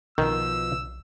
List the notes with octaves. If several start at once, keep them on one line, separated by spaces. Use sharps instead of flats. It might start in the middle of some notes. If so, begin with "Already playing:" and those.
B1 B2 D#3 F3 E6